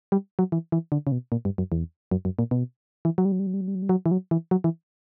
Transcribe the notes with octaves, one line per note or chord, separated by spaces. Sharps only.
G3
F#3
E3
E3
D3
C#3
B2
A#2
G2
F#2
E2
F#2
F#2
A#2
B2
E3
F#3
G3
F#3
G3
F#3
G3
F#3
G3
F#3
G3
F#3
E3
F#3
E3
F#3
E3